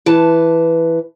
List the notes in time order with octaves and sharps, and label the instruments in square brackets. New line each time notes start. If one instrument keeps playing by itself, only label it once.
[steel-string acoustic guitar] E3 B4 A5